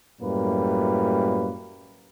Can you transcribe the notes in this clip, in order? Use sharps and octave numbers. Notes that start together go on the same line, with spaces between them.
F#2 A2 G3 A#3 B4